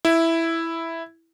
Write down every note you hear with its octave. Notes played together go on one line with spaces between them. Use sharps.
E4